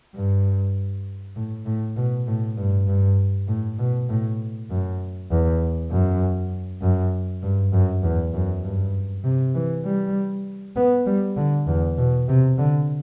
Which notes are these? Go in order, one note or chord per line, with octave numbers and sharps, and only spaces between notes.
G2
A2
A2
B2
A2
G2
G2
A2
B2
A2
F#2
E2
F#2
F#2
G2
F#2
E2
F#2
G2
C3
E3
G3
B3
G3
D3
E2
B2
C3
D3